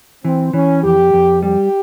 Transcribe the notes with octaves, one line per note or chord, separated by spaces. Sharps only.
E3 C4
E3 C#4
F2 G4
F2
G3 G4